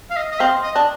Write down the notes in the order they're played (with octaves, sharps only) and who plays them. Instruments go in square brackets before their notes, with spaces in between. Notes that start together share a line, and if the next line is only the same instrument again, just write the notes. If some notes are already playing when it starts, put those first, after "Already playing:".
[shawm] F5
D#5
D#5
[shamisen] C4 [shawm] F5
[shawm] D#5
[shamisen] D4